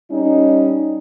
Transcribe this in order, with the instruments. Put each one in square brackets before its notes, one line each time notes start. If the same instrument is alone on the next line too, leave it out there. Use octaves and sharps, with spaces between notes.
[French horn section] G3 C#4 D#4